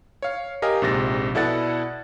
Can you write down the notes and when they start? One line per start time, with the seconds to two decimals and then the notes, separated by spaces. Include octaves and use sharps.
0.22 C#5 F5
0.62 G4 A#4 D#5 F5 G#5
0.82 A#1 G#2 C3 A6 A#6
1.35 B2 E4 A4 D5 F#5 A6